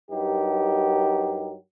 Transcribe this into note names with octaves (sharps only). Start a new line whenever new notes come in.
G2 F#3 D#4 G4 A#4